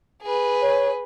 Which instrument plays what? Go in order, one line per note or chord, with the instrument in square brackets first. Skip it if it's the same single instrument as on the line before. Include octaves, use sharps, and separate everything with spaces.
[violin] G#4 B4
[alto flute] C#5